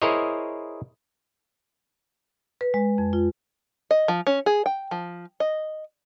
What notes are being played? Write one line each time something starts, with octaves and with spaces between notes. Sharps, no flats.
E4 G#4 A#4 C5 C#5 D#5
B4
G#3
F2
F4
D#5
F3
C#4
G#4
G5
F3
D#5